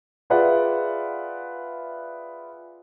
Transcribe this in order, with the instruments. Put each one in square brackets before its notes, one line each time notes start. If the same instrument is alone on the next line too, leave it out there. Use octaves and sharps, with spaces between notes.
[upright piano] F4 G#4 B4 D5 E5 F#5